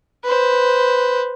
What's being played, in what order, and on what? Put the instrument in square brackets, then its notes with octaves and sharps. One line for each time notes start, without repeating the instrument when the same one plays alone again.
[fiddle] B4 C5